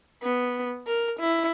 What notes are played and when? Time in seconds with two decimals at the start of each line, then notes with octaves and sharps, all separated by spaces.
0.23 B3
0.87 A#4
1.20 E4